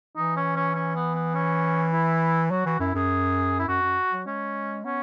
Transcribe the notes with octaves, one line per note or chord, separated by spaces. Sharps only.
E3 D#4
C#4
C#4
C#4
B3
B3
C#4
E4
F#3 F#4
E3 F#4
F#2 E4
F#2 G#4
E4
F#2 F#4
F#2
F#3
G#3 C#4
B3 C#4